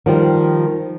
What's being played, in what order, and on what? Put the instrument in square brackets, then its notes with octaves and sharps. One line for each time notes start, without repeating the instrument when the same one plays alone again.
[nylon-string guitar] D#3 F3 G3